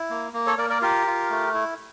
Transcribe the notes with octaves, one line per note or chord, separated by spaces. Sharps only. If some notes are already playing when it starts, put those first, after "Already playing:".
Already playing: E4
A#3
A#3
A4 C#5
A#3 A#4 D5
A#4 D5
F4 G4 A#4
F4
A3
E4